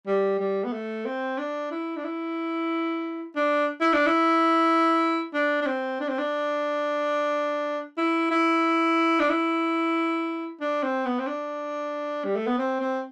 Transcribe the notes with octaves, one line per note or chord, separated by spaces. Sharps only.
G3
G3
B3
A3
C4
D4
E4
D4
E4
D4
E4
D4
E4
D4
D4
C4
D4
C4
D4
E4
E4
D4
E4
D4
C4
B3
C4
D4
G3
A3
B3
C4
C4